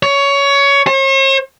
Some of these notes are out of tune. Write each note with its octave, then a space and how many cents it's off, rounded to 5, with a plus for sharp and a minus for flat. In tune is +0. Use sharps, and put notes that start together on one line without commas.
C#5 +15
C#5 -45